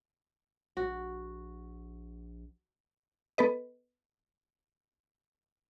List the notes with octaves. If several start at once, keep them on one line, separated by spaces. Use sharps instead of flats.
A#1 F#4
B3 A4 B4 D#5